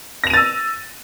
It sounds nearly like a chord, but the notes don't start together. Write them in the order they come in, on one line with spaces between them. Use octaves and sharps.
A#6 F7 D#7 A6 E6